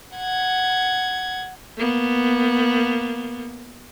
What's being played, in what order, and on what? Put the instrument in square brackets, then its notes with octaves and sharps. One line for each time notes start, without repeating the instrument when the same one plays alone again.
[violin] F#5 G#6
[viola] A#3 B3